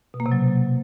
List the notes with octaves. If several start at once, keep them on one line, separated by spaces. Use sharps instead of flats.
B2
A#3
C3
F#3